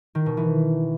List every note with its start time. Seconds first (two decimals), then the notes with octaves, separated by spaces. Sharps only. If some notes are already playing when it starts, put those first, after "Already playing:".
0.15 D#3
0.26 B2
0.37 E3